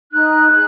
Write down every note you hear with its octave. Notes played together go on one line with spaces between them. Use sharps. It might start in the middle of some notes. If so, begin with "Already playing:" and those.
D#4 F#6
G#4